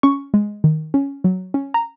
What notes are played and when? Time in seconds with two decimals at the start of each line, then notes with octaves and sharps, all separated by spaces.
0.03 C#4 C#6
0.34 G#3
0.64 D#3
0.94 C#4
1.24 F#3
1.54 C#4
1.74 A#5